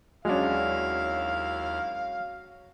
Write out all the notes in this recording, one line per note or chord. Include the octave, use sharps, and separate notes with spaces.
D#2 F#3 G#3 C#4 D4 E4 F5 F6